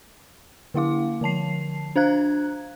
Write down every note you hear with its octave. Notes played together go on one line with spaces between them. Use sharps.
D3 A#3 E4 F5 D6
D3 F3 A5 C7
D4 C5 F5 A#5 F#6 G#6